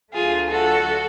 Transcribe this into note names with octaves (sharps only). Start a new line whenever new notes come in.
D2 D3 F#3 A3 F4 G#4
F#4 A4